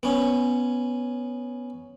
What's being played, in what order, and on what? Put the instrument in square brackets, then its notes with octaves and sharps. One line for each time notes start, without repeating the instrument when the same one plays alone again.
[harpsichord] B3 C#4